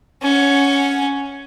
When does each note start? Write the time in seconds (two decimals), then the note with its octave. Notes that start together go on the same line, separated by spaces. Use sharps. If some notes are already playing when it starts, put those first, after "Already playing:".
0.22 C#4 F#5